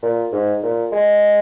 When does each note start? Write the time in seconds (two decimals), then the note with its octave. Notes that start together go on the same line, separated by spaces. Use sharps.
0.03 A#2
0.32 G#2
0.63 A#2
0.92 G#3